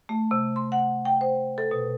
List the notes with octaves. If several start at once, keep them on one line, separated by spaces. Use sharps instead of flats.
A3
C3
C6
F#5
G5
C5
A4
B2